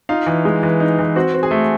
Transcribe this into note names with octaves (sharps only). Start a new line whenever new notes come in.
D#4 F4 F5
E3
G#3
E3
D#4
E3
C4 F#4 F#5
C4
G#4 G#5
A3